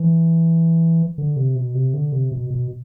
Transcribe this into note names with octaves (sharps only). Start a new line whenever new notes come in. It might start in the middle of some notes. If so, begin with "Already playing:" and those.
Already playing: E3
D3
C3
B2
C3
D3
C3
B2
B2